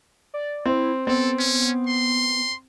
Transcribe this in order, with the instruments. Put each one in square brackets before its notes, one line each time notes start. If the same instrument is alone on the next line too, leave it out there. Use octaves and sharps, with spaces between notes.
[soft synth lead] D5
[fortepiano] C4 [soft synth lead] E4
[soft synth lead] B3 [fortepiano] C4 [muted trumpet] A4
[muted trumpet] C#4
C6